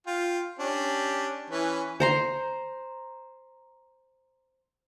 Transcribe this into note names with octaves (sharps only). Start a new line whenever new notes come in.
F4 G5
C#4 D4 G4
E3 C#4 B4
C5 A#5 C6